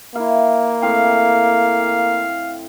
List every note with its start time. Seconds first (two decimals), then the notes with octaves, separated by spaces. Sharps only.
0.15 A#3 E4 F5
0.82 A2 C4 F5